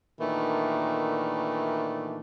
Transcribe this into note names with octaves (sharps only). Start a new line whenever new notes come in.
A#2 D#3 E3 A3 D4